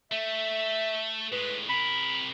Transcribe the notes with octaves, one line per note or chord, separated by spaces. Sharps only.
A3 E5
A2 G#3 B4
C3 A#4 B5